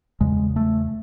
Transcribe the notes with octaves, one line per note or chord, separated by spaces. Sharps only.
E2 C#3 G#3
A3